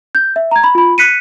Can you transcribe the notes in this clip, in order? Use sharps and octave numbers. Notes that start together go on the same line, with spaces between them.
G6
E5
A#5 G#6
B5
F4 B5
F#6 B6 C#7 D#7